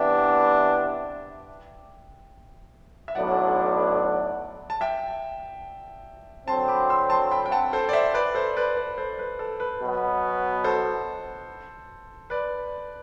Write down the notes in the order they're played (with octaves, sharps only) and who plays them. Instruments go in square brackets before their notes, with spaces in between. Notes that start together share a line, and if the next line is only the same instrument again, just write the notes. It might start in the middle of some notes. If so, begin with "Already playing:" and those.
Already playing: [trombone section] C3 E3 B3 D4 [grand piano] E5 G5
[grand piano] E5
[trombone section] B1 A2 F#3 B3 D4 [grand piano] D5 F#5
[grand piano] A5
E5 G5
[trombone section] D3 F#3 C4 [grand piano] A5 C6
[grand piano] B5 D6
C6 E6
A5 C6
G5 B5
G5
F#5 A5
A4 C5
D5
C5 E5
B4 D5
A4 C5
B4 D5
B4 D5
A4 C5
B4
A4
B4
[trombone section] B2 F#3 B3
[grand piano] A4 C5
B4 D5